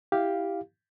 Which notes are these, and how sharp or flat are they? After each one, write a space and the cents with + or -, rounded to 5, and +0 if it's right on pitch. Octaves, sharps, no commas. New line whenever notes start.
E4 -5 G4 +0 F5 +0